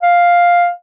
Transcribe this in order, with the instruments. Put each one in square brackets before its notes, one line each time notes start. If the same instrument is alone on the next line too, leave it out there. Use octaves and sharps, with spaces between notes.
[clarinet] F5